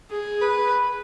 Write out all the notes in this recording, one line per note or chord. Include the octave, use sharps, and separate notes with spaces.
G#4
B4